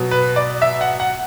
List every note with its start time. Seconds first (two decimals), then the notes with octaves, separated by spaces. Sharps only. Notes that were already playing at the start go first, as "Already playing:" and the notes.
Already playing: B2 F#3
0.11 B4
0.36 D5
0.62 E5
0.81 F#5
1.00 F#5